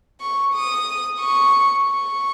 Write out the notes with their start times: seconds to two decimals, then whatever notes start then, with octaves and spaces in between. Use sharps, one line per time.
0.21 C#6
0.54 D#6
1.20 C#6
1.86 C#6